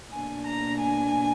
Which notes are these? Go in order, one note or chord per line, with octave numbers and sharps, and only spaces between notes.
B2 A#3 D4 G#5
A#5
G#5